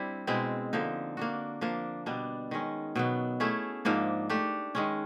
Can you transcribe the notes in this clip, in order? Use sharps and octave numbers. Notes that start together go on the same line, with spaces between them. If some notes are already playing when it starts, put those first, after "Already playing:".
Already playing: G3 C4 D4 E4
B2 G#3 C4 E4
D3 F3 A#3 D#4
A#3 D4 F#4
F3 A#3 D4
B2 G3 B3 D4
D#3 G#3 C#4
B2 F#3 B3
A3 C#4 E4 G#4
G#2 F3 A#3 D4
A3 D4 G4
D#3 G#3 C#4